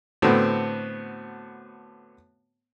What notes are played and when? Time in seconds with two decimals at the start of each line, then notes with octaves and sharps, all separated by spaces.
0.22 A2 D3 B3 C4 F#4